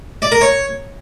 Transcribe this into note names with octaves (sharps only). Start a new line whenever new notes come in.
D5
A#4
C#5